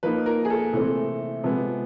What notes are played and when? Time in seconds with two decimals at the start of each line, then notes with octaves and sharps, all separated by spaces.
0.03 F3 A#3 D#4 B4
0.26 A#4
0.45 G#4
0.50 A4
0.73 C3 E3 A3 C4
1.44 C3 F3 G#3 B3